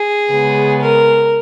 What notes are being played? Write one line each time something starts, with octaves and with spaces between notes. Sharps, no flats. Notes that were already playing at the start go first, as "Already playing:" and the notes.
Already playing: G#4
C#3 G#3 B3
A#4